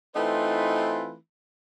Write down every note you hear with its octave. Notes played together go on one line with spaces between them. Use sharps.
E3 A3 C4 D#4 F4 B4